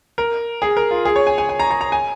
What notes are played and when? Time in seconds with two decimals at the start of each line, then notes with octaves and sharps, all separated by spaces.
0.18 A#4
0.62 G#4
0.77 A#4
0.91 F4
1.05 G#4
1.16 C#5
1.27 G#5
1.38 G#5
1.49 G#5
1.59 A#5
1.71 A#5
1.81 A#5
1.92 G#5